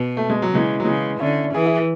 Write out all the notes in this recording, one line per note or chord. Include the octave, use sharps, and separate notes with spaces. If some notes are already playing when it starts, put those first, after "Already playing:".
Already playing: B2
A3
G#3
F#3
C#3 E3 G#3
F#3
C#3 E3 G#3
D3 C#4 E4
E3 E4 G#4
E4 G#4